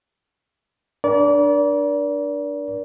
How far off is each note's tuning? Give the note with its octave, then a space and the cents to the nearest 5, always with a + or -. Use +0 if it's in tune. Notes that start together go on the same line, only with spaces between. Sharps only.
D4 +5 A#4 +40 D5 -30